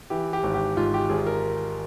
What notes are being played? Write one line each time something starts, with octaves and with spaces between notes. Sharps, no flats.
E3 G4
G4
G#1
G4
G#2 F4
G4
G#1 G#4
A#4